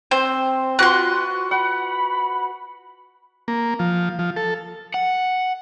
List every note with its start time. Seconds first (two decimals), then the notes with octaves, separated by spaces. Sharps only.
0.11 C4 C5
0.79 F4 F#4 B4 C6 F#6
1.51 F#5 B5
3.48 A#3
3.79 F3
4.19 F3
4.36 A4
4.94 F#5